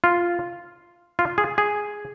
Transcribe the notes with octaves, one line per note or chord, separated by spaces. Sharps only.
F4
F4
G#4
G#4